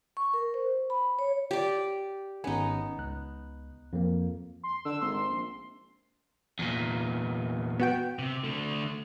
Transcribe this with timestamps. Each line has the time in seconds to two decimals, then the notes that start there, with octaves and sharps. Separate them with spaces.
0.17 C#6
0.34 A#4
0.54 C5
0.90 B5
1.19 C#5
1.51 G4 D5
2.44 G#1 B3 C#4 D#4 G#5
2.98 C#2 F#6
3.93 F2 F3 A#3
4.63 C6
4.85 D3 E6
5.01 G#1 C6
5.30 A#1
6.59 E2 A#2
7.79 B3 F#4 G5
8.19 C3
8.44 D3 A3